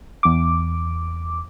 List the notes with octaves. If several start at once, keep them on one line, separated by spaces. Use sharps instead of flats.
E2 D6